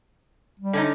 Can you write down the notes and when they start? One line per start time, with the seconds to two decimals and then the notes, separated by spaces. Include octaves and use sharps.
0.60 G3
0.73 D3 C#4 D#4